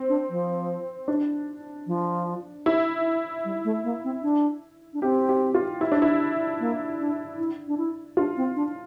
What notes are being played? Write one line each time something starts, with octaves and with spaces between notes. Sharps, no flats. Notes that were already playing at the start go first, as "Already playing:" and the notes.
Already playing: C4
D4
F3
D4
F3
E4
G3
A3
A#3
C4
D4
D4
C4 G4
G4
F4
E4
D4
E4
A#3
D4
E4
D4
E4
D4 F4
C4
D4